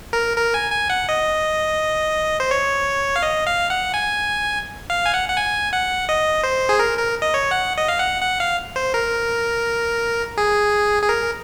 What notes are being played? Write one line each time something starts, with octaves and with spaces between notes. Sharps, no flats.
A#4
A#4
G#5
G#5
F#5
D#5
C5
C#5
F5
D#5
F5
F#5
G#5
F5
G#5
F#5
F#5
G#5
F#5
D#5
C5
G#4
A#4
A#4
D#5
C#5
F#5
D#5
F5
F#5
F#5
F5
C5
A#4
G#4
G#4
A#4